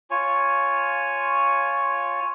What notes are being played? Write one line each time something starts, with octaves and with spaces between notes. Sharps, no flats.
F4 C#5 G#5